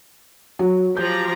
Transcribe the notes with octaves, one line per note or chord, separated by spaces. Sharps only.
F#3
F3 G4 A#5 G6